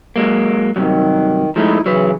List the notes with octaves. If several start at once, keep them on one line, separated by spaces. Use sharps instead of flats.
F#3 G#3 A#3
G2 C3 D#3 F#3
F3 G#3 A3 D#4 E4
C#3 E3 F#3 B4